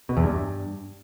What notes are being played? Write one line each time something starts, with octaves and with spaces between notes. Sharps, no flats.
B2
E2
G2